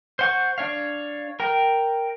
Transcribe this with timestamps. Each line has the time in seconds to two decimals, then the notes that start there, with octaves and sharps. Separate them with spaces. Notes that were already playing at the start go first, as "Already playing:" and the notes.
0.19 C5 F#5 C#6
0.58 D4 C#5 F5
1.40 A#4 G5